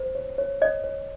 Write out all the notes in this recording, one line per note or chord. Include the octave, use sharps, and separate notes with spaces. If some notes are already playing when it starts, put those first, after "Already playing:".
Already playing: C5
C#5
C#5
C#5 D#5
C#5